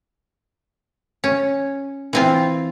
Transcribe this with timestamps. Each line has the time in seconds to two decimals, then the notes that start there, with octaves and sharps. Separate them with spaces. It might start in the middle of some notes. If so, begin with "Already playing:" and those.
1.24 C#4
2.13 E3 C4 F4